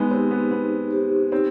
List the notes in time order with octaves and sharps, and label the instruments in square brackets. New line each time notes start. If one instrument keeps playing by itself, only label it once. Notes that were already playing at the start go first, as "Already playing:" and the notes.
Already playing: [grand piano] G#3 B3 [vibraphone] D#4
[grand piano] C4 [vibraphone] G4 C5
[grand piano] B3
[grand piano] B3 [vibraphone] D#4
[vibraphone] G4 C5
[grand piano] C4 [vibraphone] D#4